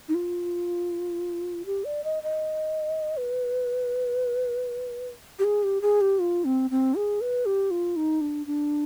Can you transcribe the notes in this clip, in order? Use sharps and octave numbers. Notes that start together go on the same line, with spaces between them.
D#4
F4
G4
D5
D#5
D#5
B4
G4
G#4
G4
G#4
G4
F4
C4
C4
G#4
B4
G4
F4
D#4
D4
D4